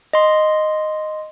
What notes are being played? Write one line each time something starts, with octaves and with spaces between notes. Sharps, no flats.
D#5 C6